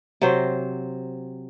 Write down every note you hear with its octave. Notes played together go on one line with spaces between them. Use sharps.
C3 F#3 C5